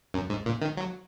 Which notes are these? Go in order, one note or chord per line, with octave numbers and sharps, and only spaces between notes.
F#2
G#2
A#2
D#3
F#3